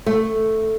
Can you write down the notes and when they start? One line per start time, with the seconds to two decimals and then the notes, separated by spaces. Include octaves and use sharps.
0.06 A3